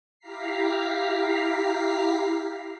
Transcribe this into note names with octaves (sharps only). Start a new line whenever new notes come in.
E4 G4 F5 A#5 B6 C7